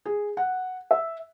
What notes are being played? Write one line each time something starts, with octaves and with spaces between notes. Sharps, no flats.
G#4
F#5
E5